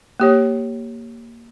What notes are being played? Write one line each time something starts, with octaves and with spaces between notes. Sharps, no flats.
A#3 G4 C#5